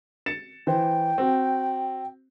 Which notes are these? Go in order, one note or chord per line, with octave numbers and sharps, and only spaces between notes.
A6 C#7 E7
E3 C5 G5
C4 F#4